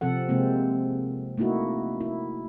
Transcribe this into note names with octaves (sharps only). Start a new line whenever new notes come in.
C3 F3 C4 A4 F#5
C3 G#3 A#3 C4
A3 A#3 D#4 E4 F#4
E4